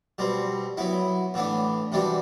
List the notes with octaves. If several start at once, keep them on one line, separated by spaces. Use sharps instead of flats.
B2 G3 C4
F#3 B3 E4
A2 E3 B3 D4
C3 E3 G3 D4 F#4